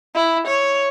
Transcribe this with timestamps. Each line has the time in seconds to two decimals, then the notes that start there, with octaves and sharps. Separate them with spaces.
0.15 E4
0.47 C#5